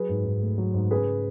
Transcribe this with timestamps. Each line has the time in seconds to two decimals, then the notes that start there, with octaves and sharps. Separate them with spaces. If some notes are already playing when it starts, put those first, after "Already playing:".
Already playing: F#3 G#4 B4
0.09 G#2
0.25 G#2
0.42 A3
0.58 F#3
0.74 G#2
0.91 C#3 G#4 B4